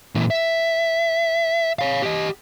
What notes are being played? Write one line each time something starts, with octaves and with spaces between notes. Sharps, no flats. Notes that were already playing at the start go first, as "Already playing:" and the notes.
A#2 E3
E5
C#5 F5
G4 D#5